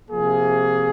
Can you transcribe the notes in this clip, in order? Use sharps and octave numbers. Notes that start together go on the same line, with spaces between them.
C3 F3 A#3 G#4